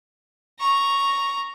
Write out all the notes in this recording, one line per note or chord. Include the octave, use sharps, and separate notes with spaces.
A#5 C#6